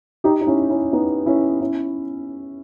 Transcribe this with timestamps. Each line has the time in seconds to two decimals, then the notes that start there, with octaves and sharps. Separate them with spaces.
0.24 D#4 G4
0.41 D#4
0.47 C#4 E4
0.70 C#4 E4
0.93 B3 D#4
1.26 C#4 E4
1.61 C#4 E4